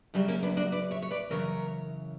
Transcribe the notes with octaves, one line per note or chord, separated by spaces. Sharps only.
F#2 C#3 F#3 G3
A#3 C#4
B3 D4
D4 F#4
B4 D5
C#5 E5
C#5
B4 D5
F#2 C#3 E3 A#4 C#5